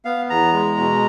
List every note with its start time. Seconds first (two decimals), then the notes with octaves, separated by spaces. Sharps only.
0.05 B3 F5
0.30 E2 A#5
0.53 G#3
0.78 B2